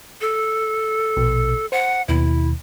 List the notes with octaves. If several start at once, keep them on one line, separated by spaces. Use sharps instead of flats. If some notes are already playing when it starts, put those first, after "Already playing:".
A4
A#1 B2
C5 F#5
D#2 B2 E4